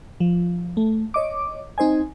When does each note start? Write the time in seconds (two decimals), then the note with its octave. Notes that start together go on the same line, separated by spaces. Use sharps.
0.20 F3
0.77 A3
1.14 C#5 D#5 D6
1.78 C4 D#4 C5 D#5 G#5